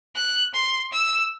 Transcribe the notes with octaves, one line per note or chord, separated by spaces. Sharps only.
F#6
C6
E6